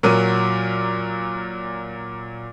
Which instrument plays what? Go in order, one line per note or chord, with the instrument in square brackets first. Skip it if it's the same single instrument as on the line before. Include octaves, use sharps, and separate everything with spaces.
[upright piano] A#2 F#3 A#4 D#7